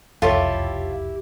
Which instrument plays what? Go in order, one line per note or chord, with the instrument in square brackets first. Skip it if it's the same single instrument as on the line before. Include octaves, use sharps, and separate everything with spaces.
[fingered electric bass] E1 C2 F2 [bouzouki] E4 G4 [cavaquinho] F4 [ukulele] A4 C#5